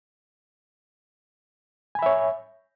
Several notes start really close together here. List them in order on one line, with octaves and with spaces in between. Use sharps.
G#5 B5 E5 C#5